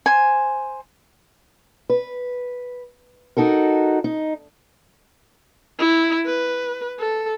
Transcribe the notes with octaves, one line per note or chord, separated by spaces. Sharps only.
C5 G#5
B4
D#4 F#4 A4 A#4
D#4
E4
B4
A4